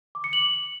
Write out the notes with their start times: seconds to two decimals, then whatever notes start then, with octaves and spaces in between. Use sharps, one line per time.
0.15 D6
0.24 C#7
0.33 F#7